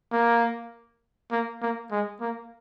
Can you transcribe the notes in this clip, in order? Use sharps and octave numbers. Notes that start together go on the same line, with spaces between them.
A#3
A#3
A#3
G#3
A#3